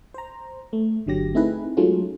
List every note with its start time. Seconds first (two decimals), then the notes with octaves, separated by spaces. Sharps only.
0.14 C5 A#5
0.73 A3
1.06 G1 D3 F#3 G4 A#6
1.34 A3 C4 D#4 E4 G#4 B4
1.77 F#3 G#3 A3 C#4 D#4 F4